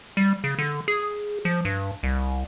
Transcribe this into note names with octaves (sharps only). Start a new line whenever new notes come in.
G3
C#3
D3
G#4
F3
G2
C2